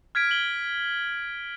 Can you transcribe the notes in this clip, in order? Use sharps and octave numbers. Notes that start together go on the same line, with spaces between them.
F6 G#6 B6 D7
F#7 G7